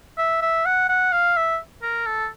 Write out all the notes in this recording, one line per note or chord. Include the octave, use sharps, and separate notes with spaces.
E5
E5
F#5
F#5
F5
E5
A#4
A4